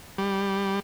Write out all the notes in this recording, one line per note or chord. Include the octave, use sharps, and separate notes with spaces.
G3